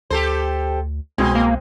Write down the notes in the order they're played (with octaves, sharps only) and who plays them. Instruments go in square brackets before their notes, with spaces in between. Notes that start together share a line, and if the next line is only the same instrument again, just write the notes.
[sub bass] D2 [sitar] G4 A4 C5
[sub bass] C2 [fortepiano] B2 G#3 [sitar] C4
[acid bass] A#3